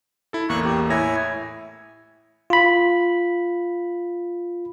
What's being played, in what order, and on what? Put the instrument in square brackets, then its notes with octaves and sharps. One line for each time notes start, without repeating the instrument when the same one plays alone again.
[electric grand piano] E4 A4
[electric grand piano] A1 E2 A#3 [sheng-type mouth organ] C#6 F#6
[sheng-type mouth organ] G4
[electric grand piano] A2 C#5 A#6 [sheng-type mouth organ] E4 G#5
[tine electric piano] F4 B5